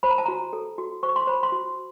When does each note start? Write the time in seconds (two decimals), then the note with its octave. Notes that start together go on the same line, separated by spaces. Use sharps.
0.03 C5 B5
0.11 A#5
0.18 A5
0.26 F#4 A#5
0.53 A4
0.78 F#4
1.03 C5 C#6
1.16 C6
1.27 C5 B5
1.43 C6
1.52 F#4